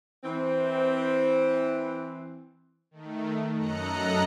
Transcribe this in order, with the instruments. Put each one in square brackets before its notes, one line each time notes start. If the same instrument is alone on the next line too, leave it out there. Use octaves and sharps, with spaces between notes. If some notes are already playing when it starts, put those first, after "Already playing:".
[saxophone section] E3 C4
[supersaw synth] D#3 A3
F#2 A4 D#5 A#5 F#6 C#7